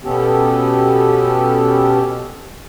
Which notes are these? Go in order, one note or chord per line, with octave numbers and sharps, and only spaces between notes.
B2 B3 C#4 G4 A4